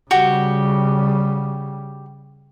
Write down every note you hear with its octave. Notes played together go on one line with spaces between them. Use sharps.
C#3 G3 F#4 G4